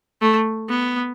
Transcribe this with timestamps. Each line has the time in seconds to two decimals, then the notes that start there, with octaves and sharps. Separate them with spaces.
0.21 A3
0.69 B3